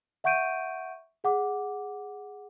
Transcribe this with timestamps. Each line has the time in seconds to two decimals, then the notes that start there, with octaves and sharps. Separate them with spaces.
0.24 E5 F#5 C#6 G6 D7 D#7
1.24 G#4 F#5 D6